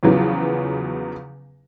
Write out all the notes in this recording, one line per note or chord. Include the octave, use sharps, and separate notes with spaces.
E2 C#3 F3 F#3 B3